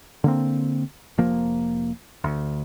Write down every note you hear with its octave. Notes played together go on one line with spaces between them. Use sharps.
D3 A#3 C4
F1 F3 A#3
D2